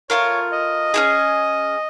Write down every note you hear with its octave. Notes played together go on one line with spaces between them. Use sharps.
A3 C4 F4 A#4 C#5
D#5
C#4 E4 G#4